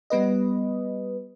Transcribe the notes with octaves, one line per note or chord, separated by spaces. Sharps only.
G3 B3 B4 D#5